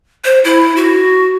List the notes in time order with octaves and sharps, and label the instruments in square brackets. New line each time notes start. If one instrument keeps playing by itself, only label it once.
[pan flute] C5
E4
F#4